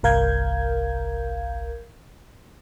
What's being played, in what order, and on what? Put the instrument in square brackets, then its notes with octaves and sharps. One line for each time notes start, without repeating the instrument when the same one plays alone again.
[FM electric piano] G1 C2 A#4 F5 G6 G#6